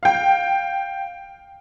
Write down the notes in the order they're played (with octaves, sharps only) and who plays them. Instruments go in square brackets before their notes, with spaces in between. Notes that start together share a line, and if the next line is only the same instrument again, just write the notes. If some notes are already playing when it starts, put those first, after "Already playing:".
[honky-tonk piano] F5 G5